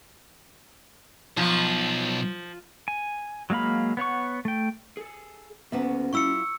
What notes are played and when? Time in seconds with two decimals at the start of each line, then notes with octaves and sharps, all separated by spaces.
1.37 B1 F3
2.88 G#5
3.50 F#3 G#3 A#3 F5 B5
3.97 B3 C#5 F#5 C#6
4.45 A3 G5
4.97 G#4 A4
5.72 D2 A#3 B3 C#4 F#4 E5
6.13 F#3 E4 F4 C#6 E6 C#7